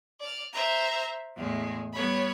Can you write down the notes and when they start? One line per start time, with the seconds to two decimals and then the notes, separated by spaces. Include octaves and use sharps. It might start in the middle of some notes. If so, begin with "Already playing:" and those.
0.20 D5 F6
0.53 C5 E5 A#5
1.35 E2 A2 G#3
1.94 G3 B3 C#5 B5